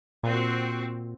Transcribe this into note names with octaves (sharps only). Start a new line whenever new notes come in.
A#2 C4 F#4